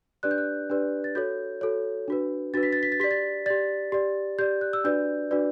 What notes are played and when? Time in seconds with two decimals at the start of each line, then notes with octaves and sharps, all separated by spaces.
0.23 D4 G4 B4 D5 F#6
0.31 G6
0.38 F#6
0.70 D4 G4 B4 D5
1.04 A6
1.15 F#4 A4 C#5 G6
1.61 F#4 A4 C#5
2.08 D4 F#4 B4
2.54 D4 F#4 B4 A6
2.63 B6
2.73 A6
2.83 B6
2.92 A6
3.00 G4 D5 B6
3.11 A6
3.46 G4 D5 A6
3.92 G4 D5
4.39 G4 D5 G6
4.61 F#6
4.73 E6
4.84 D4 F#4 B4 D5 G6
5.31 D4 F#4 B4 D5